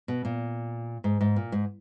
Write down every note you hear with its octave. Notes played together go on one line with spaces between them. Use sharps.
B2
A#2
G#2
G#2
A#2
G#2